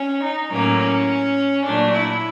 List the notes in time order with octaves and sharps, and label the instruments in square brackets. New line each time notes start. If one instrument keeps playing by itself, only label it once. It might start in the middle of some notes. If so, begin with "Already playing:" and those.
Already playing: [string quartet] C#4
D#4
A2 F#3 A#3 C#4
C#4
A#2 F#3 A3 D4
E4